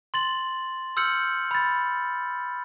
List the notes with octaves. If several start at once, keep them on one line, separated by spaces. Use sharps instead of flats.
C6 A6 F#7
C6 E6 F6 G6 C#7 F#7
B5 A6